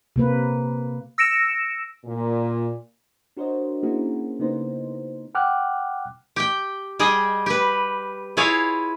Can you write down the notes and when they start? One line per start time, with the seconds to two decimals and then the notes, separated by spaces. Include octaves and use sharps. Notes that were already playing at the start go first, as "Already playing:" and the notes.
0.16 C3 A#3 B4
1.18 E6 A#6 C#7 D7 E7
2.05 A#2
3.37 D4 F#4 A#4 C5 C#5 D#5
3.83 A#3 C#4 E4 F#4 G#4 A#4
4.39 C#3 A#3 B3 D#4 C5
5.35 F#5 G5 D6 F6 F#6
6.36 G4 G5
6.99 G3 G#4 D#5 G5
7.46 G4 B4
8.37 E4 F4 G#4 C#5 F5